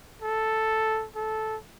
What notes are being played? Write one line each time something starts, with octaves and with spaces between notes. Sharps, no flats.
A4
A4